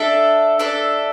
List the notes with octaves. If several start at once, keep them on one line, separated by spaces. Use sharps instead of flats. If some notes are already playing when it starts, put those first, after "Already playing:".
Already playing: D4 A4 E5
D4 A4 E5